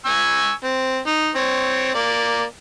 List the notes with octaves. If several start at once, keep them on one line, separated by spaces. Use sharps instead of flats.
G#5 C#6 E6
C4
D#4
C4 C#5
A#3 D5